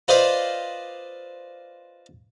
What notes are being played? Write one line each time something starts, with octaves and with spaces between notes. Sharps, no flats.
F4 B4 C5 D5 D#5 F5